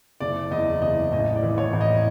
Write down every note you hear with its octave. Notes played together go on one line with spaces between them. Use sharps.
F#1 D5
E2 D#5
F#1 D#5
A1 D#5
D5
E3
C#5
A1
D#5